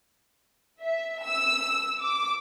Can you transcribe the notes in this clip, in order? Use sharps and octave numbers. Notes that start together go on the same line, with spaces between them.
E5
E6
D6